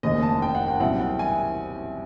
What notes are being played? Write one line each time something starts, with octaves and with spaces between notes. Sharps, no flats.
F1 D#2 C#3 D#5
A5
G5
F#5
G5
C2 B2 F#3 F#5
G5
G#5